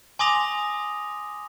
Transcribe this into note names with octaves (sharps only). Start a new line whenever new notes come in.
G#5 C6 D6 D#6 A#6 F7